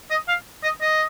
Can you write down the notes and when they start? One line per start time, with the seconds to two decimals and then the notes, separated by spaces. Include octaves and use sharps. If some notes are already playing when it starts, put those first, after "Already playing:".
0.10 D#5
0.28 F5
0.63 D#5
0.81 D#5